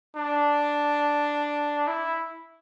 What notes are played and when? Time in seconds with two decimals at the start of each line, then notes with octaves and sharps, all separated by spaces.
0.16 D4
1.87 E4